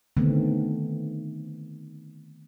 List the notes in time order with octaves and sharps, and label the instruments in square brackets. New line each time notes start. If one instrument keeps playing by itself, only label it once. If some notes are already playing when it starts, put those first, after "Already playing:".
[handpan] D3 D#3 A3 B3 C4